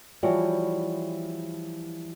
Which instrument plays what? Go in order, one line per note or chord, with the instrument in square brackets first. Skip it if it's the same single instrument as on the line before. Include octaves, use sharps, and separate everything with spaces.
[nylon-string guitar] E3 F3 G3 E4 F#4 C#5